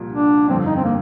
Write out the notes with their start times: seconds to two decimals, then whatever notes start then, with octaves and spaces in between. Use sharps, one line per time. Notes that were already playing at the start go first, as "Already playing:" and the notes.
Already playing: C2 A#2 F3
0.12 D4
0.48 G1 F2 D3 C4
0.66 D#4
0.75 C4
0.84 A#3